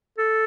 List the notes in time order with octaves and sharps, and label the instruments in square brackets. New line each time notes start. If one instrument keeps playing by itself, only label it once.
[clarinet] A4